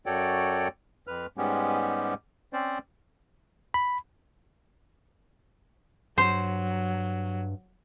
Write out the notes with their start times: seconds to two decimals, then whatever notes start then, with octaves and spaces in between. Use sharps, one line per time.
0.06 F#2 F#4 A4 C#5 D5 G5
1.07 F2 B4 F6
1.38 G#2 G3 G#3 B3 C#4 G4
2.53 C4 C#4 C5 D5
3.74 B5
6.18 G2 F#3 C5